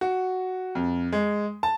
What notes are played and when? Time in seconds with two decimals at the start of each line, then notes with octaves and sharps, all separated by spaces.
0.01 F#4
0.75 F2
1.12 G#3
1.63 A5